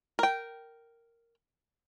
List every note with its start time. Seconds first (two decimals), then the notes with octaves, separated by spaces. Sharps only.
0.19 A#4 G5